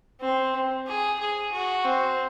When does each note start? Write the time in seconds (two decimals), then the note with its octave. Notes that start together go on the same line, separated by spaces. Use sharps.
0.21 C4
0.87 G#4
1.20 G#4
1.52 F#4
1.85 C4